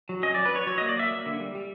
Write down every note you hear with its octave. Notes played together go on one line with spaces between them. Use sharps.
F#3
C#4 D#5
F#3 D5
B4
F#3 C#5
F#3 C#5
A#3 D#5
D5
F#3 E5
A#3
D3
G3
G3